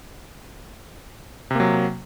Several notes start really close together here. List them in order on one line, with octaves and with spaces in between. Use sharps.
C3 A#3 F#3